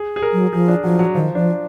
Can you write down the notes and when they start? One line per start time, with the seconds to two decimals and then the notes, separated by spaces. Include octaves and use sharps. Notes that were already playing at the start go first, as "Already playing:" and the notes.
Already playing: G#4
0.16 G#4
0.22 A#4
0.33 F#3
0.53 F3 G#4
0.68 D4
0.84 F3 F#3
0.99 F#3
1.15 D#3 F3
1.35 F3 D4